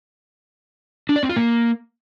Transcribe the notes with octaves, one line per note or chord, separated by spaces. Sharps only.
D4
D5
C4
F4
A#3